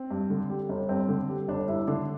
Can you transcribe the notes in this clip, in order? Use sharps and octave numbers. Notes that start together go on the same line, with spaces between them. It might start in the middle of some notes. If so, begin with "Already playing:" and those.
Already playing: C4
G2
D3
G3
G1
G2 C4
D3
G3
G1 D4
G2 E4
D3 D4